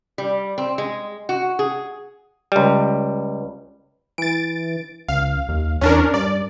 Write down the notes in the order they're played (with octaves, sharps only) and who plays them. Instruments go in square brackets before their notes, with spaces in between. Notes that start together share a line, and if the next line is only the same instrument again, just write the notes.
[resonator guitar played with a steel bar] G3
C4
G#3
F#4
G#4
[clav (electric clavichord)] C#2 G3
[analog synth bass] E3 [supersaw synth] A6 D7
[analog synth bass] C#2 [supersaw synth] F5
[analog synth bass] D#2
[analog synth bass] E2 [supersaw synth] C#4 D4 A#4
[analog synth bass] G2 [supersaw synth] D5